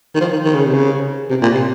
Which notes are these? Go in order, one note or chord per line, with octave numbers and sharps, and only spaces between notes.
D#3
F3
D#3
D#3
C#3
C3
C#3
C3
A#2
C3